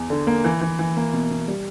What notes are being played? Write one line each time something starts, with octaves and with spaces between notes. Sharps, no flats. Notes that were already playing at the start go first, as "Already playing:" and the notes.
Already playing: E2
D3
A#3
E3
E3
E3
A#3
B2
B2
G3